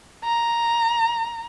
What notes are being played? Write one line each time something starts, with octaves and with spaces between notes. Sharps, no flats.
A#5